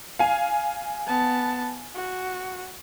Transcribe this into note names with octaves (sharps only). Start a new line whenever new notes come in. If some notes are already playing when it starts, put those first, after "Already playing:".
F5 G#5
B3 A5
F#4